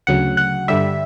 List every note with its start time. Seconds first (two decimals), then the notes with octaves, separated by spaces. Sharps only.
0.07 D2 C#3 F#3 F#5
0.37 F#5
0.68 G2 D3 G3 E5